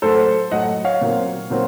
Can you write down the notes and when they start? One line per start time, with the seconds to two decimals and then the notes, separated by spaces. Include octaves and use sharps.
0.02 A2 F#3 A3 A4 C5
0.51 A2 F#3 A3 D#5 F#5
0.85 C#5 F5
1.01 A#2 F#3 C4
1.50 A#2 F#3 C4